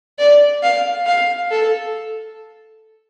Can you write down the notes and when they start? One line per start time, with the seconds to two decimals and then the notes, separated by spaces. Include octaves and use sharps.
0.19 D5
0.63 F5
1.06 F5
1.51 A4